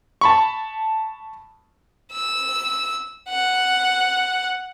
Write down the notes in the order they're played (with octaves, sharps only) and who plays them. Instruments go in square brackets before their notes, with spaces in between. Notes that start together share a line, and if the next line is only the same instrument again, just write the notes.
[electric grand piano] A5 B5 C#6
[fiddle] E6
F#5